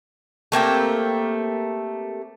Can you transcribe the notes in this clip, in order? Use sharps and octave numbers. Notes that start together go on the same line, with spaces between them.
A3 A#3 C4 G4